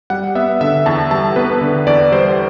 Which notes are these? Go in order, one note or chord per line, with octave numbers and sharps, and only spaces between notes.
G3 F#5
B3 E5
D3 E5
E2 A5
G3 A5
B3 B4
D3
E2 D5
G3 C5